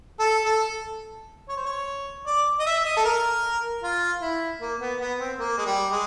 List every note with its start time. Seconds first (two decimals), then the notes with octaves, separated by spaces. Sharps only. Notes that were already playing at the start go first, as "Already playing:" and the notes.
0.20 A4
0.45 A4
1.49 C#5
1.57 C5
1.66 C#5
2.27 D5
2.60 D#5
2.67 E5
2.85 D#5
2.97 A4
3.05 A#4
3.84 F4
4.22 E4
4.61 A#3
4.81 B3
5.00 B3
5.20 C4
5.39 A#3
5.58 G#3
5.66 G3
5.91 G#3